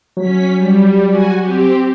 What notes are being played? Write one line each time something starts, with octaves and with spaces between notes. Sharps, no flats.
F#3 C#4 B6
G3
F#4 G#5
C4 G4